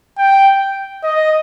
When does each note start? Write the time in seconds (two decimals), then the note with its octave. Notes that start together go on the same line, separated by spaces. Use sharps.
0.18 G5
1.03 D#5